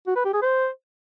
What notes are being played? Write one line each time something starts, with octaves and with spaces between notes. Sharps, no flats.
F#4
B4
G4
G#4
C5